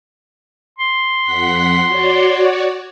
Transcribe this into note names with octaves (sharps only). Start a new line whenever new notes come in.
C6
F2 F#5 B6
F#4 C#5 D5